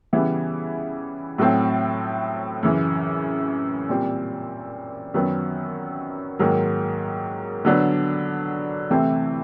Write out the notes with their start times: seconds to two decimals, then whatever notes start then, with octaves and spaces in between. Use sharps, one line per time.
0.13 C#3 E3 G3 B3 E4
1.38 A2 F#3 A3 C4
2.63 F#2 C#3 E3
3.89 A#2 G3 C4
5.14 F#2 D#3 F#3 B3
6.39 G#2 D#3 F#3 A#3
7.65 D3 F#3 B3 D4
8.90 C3 E3 A3 C4 E4